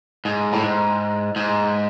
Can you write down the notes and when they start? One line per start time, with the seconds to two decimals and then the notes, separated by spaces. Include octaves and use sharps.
0.25 G#2
0.53 A2
0.63 G#2
1.36 G#2